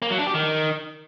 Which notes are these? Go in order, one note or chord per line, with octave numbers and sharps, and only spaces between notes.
A#3
F#3
D4
G4
D#3